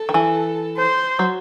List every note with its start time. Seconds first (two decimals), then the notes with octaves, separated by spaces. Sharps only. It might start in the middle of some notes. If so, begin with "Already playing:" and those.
Already playing: A4
0.09 D#3
0.14 E3
0.77 C5
1.19 F#3